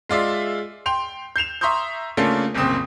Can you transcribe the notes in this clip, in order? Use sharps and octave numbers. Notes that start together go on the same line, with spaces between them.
G#3 F4 D5 E5
G5 C6 F7
G6 C7 E7 F7
E5 A#5 C6 C#6 D#6 G6
C#3 A3 A#3 C#4 D4 F4
F#1 C2 A#2 C#3 C4 D#6